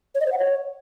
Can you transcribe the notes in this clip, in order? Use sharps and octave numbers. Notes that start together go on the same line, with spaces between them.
C#5
D#5
C5
F#5
C#5